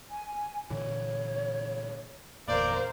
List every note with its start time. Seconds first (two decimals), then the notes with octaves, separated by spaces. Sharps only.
0.10 G#5
0.70 A#2 D3 E3 C#5
2.48 G1 E2 A#2 A#4 C5 D5 F5